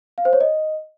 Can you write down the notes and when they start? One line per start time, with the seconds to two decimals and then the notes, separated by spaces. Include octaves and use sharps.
0.18 F5
0.25 C5
0.33 C#5
0.40 D#5